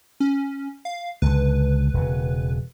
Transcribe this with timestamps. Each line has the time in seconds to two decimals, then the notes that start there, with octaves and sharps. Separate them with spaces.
0.20 C#4
0.85 F5
1.22 C#2 D3 B4
1.94 E1 C#3